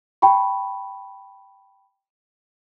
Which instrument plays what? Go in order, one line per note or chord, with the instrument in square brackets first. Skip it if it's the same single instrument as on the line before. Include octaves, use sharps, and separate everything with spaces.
[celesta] G5 A5 B5 C#6